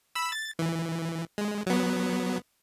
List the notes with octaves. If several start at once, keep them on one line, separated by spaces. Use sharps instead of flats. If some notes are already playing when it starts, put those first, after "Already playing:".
B5 E6
A6
E3
G#3
F#3 B3